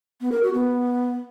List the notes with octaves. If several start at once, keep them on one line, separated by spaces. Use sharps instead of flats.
B3
A#4
F#4
B3